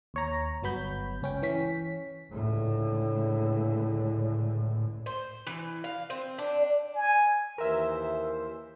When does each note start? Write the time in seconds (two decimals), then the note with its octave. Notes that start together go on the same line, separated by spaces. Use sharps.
0.14 D#2 C#5 A#5
0.63 G1 F#3 B3 B5 G6
1.22 C#2 C#4 G5
1.42 E3 C#4 B6
2.31 C#2 A2 D3
5.06 C5
5.47 E3
5.84 F5
6.10 C4
6.38 D4
6.95 G#5
7.58 D#2 E3 A#4 C5 E5